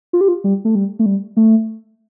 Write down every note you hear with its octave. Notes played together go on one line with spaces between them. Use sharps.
F4
G4
F4
G3
A3
G3
A3
G3
A3